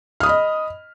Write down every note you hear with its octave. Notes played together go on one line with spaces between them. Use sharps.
D#5 B5 D#6 F6